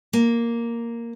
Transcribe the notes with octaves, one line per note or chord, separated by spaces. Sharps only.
A#3